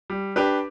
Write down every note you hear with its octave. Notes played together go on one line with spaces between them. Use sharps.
G3
D4 G4 B4